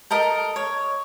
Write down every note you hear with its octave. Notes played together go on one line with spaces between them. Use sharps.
A4 A#4 D#5
C#5